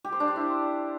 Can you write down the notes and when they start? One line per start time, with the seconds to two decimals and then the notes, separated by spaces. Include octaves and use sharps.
0.05 G4
0.12 C5
0.20 D4
0.28 C5
0.36 E4